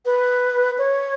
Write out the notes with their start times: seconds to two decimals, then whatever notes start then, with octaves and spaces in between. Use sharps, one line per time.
0.05 B4
0.78 C#5